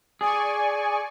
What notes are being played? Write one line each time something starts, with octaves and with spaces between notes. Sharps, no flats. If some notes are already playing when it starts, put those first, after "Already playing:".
G#4 D5 G#5 C#6